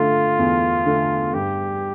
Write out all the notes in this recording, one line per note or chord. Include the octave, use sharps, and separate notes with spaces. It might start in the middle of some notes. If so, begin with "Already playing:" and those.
Already playing: D3 A3 F4
E2
D3 A3
G2 G4